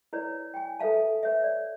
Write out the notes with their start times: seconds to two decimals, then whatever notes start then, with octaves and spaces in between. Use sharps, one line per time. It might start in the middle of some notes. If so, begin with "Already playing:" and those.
0.13 E4 B4 C#5 D5
0.54 G5 G#5
0.80 A4 B4 E5 F5 A5
1.23 B4 C#5 E5
1.43 D5